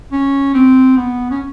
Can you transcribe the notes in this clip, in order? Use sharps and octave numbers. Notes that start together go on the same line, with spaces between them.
C#4
C4
B3
C#4